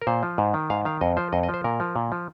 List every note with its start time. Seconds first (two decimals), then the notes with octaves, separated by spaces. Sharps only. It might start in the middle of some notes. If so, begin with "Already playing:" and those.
0.02 A#4
0.07 A#2 C5
0.23 F3
0.38 G#2
0.54 D#3
0.70 G#2 F5
0.85 D#3 F5
1.01 F2 D#5
1.17 F3 C5
1.33 F2 D#5
1.43 D#5
1.49 F3
1.54 C5
1.64 A#2 A#4
1.80 F3
1.96 A#2
2.12 F3